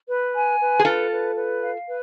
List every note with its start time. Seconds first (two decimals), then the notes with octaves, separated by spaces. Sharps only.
0.08 B4
0.34 G#5
0.59 B4
0.79 G#4
0.85 F4 A4 B4
1.11 B4
1.36 B4
1.61 F5
1.86 B4